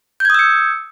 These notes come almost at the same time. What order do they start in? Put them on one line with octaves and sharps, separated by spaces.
G6 G#6 D#6 E6 C#7